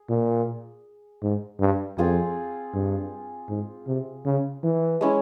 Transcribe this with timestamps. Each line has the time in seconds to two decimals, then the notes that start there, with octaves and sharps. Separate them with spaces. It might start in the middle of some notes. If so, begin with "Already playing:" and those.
Already playing: G#4
0.09 A#2
1.23 G#2
1.60 G2
1.97 F2 C4 F4 G#4
2.74 G2
3.49 G#2
3.87 C3
4.25 C#3
4.63 E3
5.01 G#3 C#4 E4